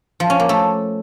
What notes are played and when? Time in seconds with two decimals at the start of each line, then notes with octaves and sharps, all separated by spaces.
0.20 F3
0.30 C#4
0.40 A#3
0.49 A3